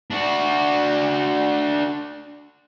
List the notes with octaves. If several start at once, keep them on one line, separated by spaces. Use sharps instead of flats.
D4 F#4